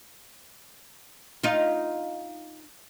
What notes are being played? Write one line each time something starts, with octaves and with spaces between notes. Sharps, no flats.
D#4 F4